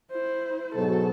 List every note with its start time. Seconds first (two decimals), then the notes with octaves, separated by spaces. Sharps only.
0.11 E4 C5
0.76 G#2 B2 F#3 A4